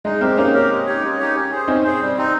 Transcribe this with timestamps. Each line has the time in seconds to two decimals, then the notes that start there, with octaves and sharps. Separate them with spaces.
0.05 G#3 D#4
0.21 G#3 C4 G4 A#4
0.37 A#3 C#4 D#4
0.54 G4 A#4
0.70 G#3
0.86 D#4 G4 C#5
1.03 G#3
1.19 D#4 G4 C#5
1.35 C#4
1.52 G#4 C5
1.68 C4 C#4 D#4
1.84 G#4 C5
2.01 G3
2.17 C4 D#4